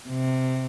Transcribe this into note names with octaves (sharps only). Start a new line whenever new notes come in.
C3